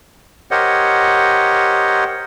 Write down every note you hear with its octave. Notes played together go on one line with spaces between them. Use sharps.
G4 A#4 C5 C#5 D#5 F#5